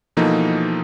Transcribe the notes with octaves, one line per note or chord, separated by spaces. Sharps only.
B2 E3 F3 A#3 D#4 A4